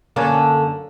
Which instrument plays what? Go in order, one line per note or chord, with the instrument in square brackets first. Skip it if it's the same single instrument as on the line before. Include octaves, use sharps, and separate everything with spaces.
[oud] F#2 D3 A4 [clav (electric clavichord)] A#3 C#4 G#5